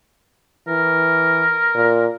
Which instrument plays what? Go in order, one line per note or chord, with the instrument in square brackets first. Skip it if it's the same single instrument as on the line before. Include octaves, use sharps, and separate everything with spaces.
[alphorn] E3 [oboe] A#4
[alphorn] A#2